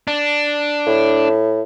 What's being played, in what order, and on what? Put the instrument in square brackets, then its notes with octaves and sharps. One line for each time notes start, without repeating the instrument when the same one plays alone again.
[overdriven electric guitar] D4
[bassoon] A2